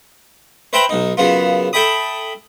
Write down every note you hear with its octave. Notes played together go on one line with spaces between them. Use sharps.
B4 C5 E5 G5 A#5 B5
B1 D#4
F#2 C#3 B3 F4
A4 E5 G5 B5 D#6